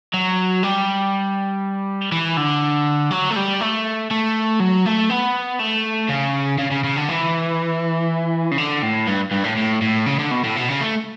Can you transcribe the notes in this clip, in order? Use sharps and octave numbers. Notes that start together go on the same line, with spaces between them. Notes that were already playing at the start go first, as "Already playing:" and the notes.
F#3
G3
E3
D3
F#3
A3
G3
A3
A3
F#3
A3
B3
A3
C#3
C#3
C#3
C#3
D3
E3
C#3
D3
A2
G2
G2
A2
A2
A2
C#3
D3
B2
A2
B2
C#3
A3